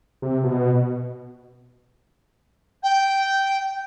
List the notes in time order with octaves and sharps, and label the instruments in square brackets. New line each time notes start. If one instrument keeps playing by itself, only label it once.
[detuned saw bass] C3
B2
[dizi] G5